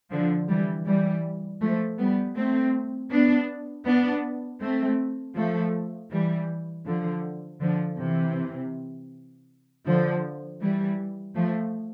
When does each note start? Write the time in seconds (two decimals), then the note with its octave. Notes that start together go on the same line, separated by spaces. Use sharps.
0.10 D3 F3
0.48 E3 G3
0.86 E3 G3
1.61 F3 A3
1.98 G3 B3
2.35 A3 C4
3.11 B3 D4
3.85 B3 D4
4.61 A3 C4
5.35 F3 A3
6.11 E3 G3
6.86 D3 F3
7.60 D3 F3
7.98 C3 E3
9.86 D3 F3
10.60 E3 G3
11.35 F3 A3